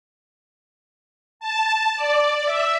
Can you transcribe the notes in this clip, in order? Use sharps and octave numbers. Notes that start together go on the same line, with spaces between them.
A5
D5
E5